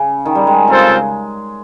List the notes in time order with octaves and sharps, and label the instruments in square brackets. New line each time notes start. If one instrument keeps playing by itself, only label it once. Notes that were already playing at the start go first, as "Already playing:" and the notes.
Already playing: [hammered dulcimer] C#3
D#3
G3
G#3
[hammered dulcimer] C#3 [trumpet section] C4 F4 A4 C5
[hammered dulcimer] C#3